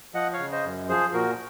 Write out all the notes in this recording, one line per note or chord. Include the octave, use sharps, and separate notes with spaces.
F3 D#5 F#5
C#5 F5
C#3
C5 D#5
F#2
F3 G#4 C5
A#2 F#4 A#4